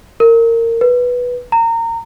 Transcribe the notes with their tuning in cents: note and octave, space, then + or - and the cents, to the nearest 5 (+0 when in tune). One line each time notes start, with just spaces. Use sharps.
A#4 -20
B4 -5
A#5 -25